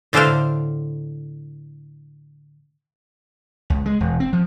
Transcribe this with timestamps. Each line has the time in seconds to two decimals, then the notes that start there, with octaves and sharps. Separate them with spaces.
0.13 A2 D3 D4 A4 C5 F5
3.70 C#2
3.86 G#3
4.00 E1
4.20 C4
4.33 F3